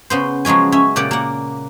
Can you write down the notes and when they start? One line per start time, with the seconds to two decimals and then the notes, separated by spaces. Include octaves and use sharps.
0.10 C#3 B3 C5
0.45 F3 F#3 G#3 C#4 G#5
0.72 C#4 E5 G#5
0.96 A#2 C#3 G4 D5 F#5
1.11 A#3 F#5